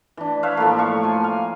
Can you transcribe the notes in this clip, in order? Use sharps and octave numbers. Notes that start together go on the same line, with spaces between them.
E3 D4
B4 C#5 E5 F5
A2 F3 A3 A#3
F5 C#6
F3 G#5
F5